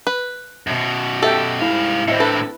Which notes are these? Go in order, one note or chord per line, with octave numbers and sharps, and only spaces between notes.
B4
F#2 B2
G4 A4 E5 G5
C2 G#2 E4 F5
A2 C4 E4 C5 D#5 E5
D3 A4 B4